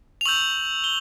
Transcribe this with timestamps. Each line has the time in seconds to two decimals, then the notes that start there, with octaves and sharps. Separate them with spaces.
0.21 F7
0.25 C#6 E6 G6 F#7
0.84 G7